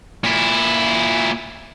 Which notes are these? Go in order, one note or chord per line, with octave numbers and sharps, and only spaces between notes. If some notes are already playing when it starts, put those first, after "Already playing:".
A#2 E4